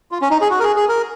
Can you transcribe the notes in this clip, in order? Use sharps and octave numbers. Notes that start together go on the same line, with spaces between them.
F4
C#4
D#4
G#4
F#4
A#4
G#4
G#4
A#4